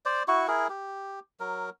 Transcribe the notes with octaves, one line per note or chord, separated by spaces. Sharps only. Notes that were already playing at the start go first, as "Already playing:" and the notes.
C5 D5
E4 F#4 C#6
E4 G#4 A#4
G4
F#3 A#4